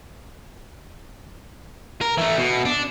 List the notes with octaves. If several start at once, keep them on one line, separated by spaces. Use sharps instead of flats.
A#4
E3 A3
B2
D4